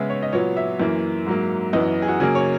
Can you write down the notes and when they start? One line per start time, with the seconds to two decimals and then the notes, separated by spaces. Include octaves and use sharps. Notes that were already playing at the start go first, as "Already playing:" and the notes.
Already playing: C#3 G#3 B3 E5
0.10 C#5
0.22 D#5
0.33 A#2 F#3 B3 C#5
0.57 E5
0.80 F#2 E3 A#3
1.26 G#2 F#3 A#3
1.73 F#2 E3 B3 D#5
2.02 G#4
2.08 F#4
2.20 C#3 F#3 A#3 G#4
2.35 C#5